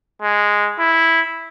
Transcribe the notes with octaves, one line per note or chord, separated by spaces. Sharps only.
G#3
E4